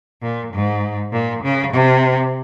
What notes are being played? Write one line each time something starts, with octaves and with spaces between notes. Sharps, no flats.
A#2
G#2
A#2
C#3
C3